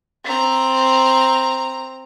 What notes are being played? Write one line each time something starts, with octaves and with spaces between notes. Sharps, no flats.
C4 A#5